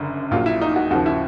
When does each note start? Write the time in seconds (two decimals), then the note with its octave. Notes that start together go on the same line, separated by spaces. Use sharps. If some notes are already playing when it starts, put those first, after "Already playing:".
Already playing: F#1 F#2 D3
0.31 A#1 A#2 F#3 F4
0.46 E4
0.61 D#4
0.76 F#4
0.90 D#2 C#3 F3 F#4
1.06 E4